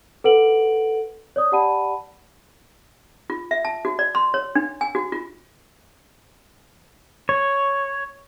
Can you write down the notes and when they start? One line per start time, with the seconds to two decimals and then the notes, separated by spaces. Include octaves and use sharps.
0.24 A4 B4 F#5 D7 F#7
1.36 C#5 D5 D#6
1.52 G4 D5 F#5 A5 B5 D#7
3.30 F4
3.51 E5
3.65 A5
3.85 F#4
3.99 D5
4.15 C6
4.34 C#5
4.55 D4
4.81 G#5
4.95 F#4
5.12 F4
7.29 C#5